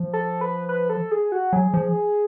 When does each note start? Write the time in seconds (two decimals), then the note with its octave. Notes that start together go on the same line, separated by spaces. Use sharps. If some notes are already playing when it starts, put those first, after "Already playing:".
Already playing: F3
0.13 A4
0.41 B4
0.69 B4
0.90 A4
1.11 G#4
1.32 F#4
1.53 F#3 G#4
1.74 F3